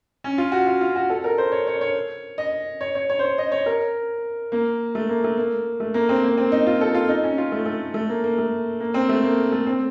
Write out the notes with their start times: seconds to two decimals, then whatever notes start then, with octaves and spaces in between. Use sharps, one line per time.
0.24 C#4
0.38 F4
0.52 F#4
0.67 F4
0.81 F4
0.96 F#4
1.10 A4
1.24 A#4
1.38 C5
1.52 C#5
1.67 C#5
1.81 C#5
2.38 D#5
2.81 C#5
2.95 C#5
3.10 C#5
3.19 C5
3.23 C#5
3.38 D#5
3.52 C#5
3.66 A#4
4.52 A#3
4.95 A3
5.09 A#3
5.24 A3
5.38 A#3
5.80 A3
5.94 A#3
6.09 C4
6.23 A#3
6.38 C4
6.52 D#4
6.67 F4
6.81 A4
6.94 F4
7.09 D#4
7.24 C#4
7.38 F4
7.52 A3
7.66 A3
7.94 A3
8.09 A#3
8.24 A#3
8.38 A3
8.80 A#3
8.94 C4
9.09 A3
9.23 A#3
9.52 A3
9.67 C4